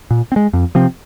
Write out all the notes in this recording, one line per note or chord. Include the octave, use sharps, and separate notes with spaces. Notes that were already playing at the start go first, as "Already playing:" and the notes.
A#2
C4
G#3
F2
C3 F3 C4